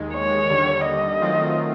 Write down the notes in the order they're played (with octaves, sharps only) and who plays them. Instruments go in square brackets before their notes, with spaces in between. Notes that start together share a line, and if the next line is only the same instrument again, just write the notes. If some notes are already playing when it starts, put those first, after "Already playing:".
Already playing: [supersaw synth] D#2 D#3 G#3
[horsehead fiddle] C#5
[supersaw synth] D#2 D3 G3
[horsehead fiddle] D#5
[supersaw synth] D#3 F#3 A3 C4 F4